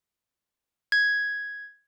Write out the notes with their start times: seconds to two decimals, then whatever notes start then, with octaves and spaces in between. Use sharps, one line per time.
0.92 G#6